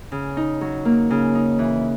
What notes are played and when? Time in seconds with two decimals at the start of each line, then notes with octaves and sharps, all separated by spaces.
0.12 C#3
0.37 D#4
0.61 F#3
0.85 A#3
1.10 C#3
1.35 D#4
1.59 E3